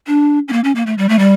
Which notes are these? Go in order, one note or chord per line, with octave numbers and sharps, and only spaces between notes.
D4
C#4
A#3
C#4
A#3
A3
G3
A3
G3